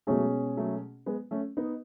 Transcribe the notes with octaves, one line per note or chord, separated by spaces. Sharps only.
B2 F#3 G#3 A3 C#4 G#4
F#3 A3
G#3 B3
A3 C#4
B3 D#4